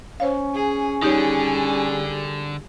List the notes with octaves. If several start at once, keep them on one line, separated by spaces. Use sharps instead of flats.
C#4 C5 C#5 F5
G#4
D3 G3 D#4 G4 G#4 C#5